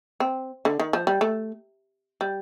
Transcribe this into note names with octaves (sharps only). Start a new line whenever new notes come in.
C4
D3
D#3
F3
G3
A3
G3